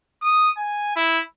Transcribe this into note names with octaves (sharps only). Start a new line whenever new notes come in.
D#6
G#5
E4